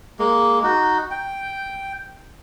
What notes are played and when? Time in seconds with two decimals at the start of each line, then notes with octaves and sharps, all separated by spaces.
0.19 G#3 A#3
0.63 D#4 F#4
1.11 G5